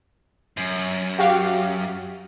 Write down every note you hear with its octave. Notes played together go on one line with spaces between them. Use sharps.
F#2
F#4 G4 F5